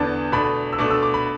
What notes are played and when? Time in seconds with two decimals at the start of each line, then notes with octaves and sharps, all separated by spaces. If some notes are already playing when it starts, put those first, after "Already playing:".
Already playing: E2 D3 B3 D4 A5
0.32 B2 A3 D4 B5
0.73 E6
0.78 B2 A3 D4 D6
0.91 E6
1.03 D6
1.14 B5